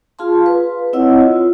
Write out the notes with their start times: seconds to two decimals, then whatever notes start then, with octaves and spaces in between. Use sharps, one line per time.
0.19 F4 G#4 F5 A5 C6
0.46 B4
0.93 C4 E4 C#5 D#5 F#5 E6
1.20 F4